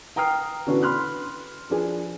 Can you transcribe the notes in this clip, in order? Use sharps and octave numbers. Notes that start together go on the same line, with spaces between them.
G5 A#5 D#6 F6 C7
D3 E3 B3 C#4 D4 F#4
B5 C6 F6 F#6
F3 D4 G#4